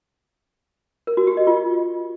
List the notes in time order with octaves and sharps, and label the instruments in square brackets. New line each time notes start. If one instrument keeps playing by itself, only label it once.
[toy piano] A#4
F#4
G4
D#5
F4